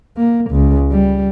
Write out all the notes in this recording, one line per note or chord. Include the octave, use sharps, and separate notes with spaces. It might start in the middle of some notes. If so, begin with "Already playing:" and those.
A#3
C#2
G3